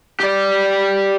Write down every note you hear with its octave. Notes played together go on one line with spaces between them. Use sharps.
G4 D5